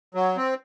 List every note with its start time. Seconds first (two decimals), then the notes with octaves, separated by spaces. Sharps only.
0.15 F#3
0.37 C4